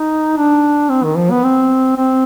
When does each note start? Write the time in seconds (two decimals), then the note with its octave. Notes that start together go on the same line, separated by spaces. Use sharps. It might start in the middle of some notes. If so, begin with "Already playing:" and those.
Already playing: D#4
0.37 D4
0.90 C4
1.04 D#3
1.17 F3
1.31 B3
1.44 C4
1.97 C4